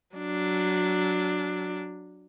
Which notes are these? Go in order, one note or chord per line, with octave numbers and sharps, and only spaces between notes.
F#3 D4